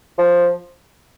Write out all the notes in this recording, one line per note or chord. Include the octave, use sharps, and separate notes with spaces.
F3